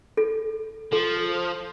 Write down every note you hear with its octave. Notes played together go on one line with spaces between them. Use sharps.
A4
F3 A4